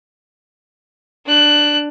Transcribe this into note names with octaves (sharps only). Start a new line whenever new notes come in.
D4 F#6